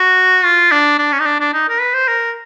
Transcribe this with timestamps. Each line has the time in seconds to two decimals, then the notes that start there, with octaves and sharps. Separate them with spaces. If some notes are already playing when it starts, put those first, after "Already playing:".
Already playing: F#4
0.44 F4
0.72 D4
0.99 D4
1.12 C#4
1.20 D#4
1.25 D4
1.40 D4
1.54 D#4
1.69 A#4
1.81 B4
1.94 C5
2.08 A#4